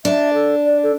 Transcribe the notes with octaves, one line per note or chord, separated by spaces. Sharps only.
D4 E5
A4
D5
A4